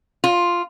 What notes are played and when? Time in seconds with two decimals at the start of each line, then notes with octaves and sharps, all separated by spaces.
0.24 F4